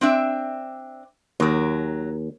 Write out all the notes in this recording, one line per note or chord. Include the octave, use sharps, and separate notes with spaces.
C4 D4 E5
D#2 F#3 A#4